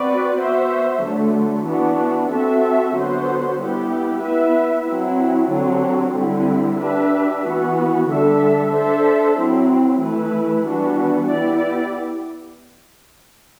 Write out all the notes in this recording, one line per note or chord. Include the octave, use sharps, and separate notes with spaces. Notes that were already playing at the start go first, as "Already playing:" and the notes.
Already playing: C4 F#4 B4 D5
B3 F#4 C5 E5
D3 F#3 A3
E3 B3 D4 F#4
C4 F#4 A4 E5
D3 F#3 B3 F#4 C5
G3 B3 E4 G4
B3 E4 B4 E5
F#3 C4 E4
D3 F#3 C4 G4
D3 G3 C4 E4
D4 G4 B4 E5
E3 B3 F#4
D3 G3 D4 A4 E5
D4 A4 C5 E5
F#3 C4 E4
E3 A3 E4 B4
E3 G3 B3 D4 F#4
B3 E4 G4 D5